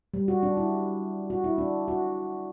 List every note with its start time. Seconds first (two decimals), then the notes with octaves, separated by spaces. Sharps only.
0.14 G3
0.28 F#4
0.43 D4
0.57 E4
1.30 F#4
1.44 E4
1.58 D4
1.88 F#4